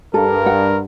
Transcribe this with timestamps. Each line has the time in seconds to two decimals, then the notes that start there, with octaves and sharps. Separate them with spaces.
0.14 G2 A4 A#4
0.46 F#5